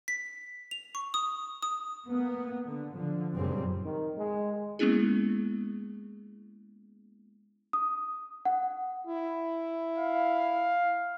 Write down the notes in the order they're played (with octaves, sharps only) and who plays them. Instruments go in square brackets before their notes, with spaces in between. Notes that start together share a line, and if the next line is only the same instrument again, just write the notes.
[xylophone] B6
F7
C#6
D#6
D#6
[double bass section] A#3 B3
D3
D3 F3
F#1 F#2 A#2 C#3 G3 C4
[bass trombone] D#3
G#3
[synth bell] G#3 A#3 B3 C#4 E4 G#4
[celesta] D#6
F#5
[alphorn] E4
[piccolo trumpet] F5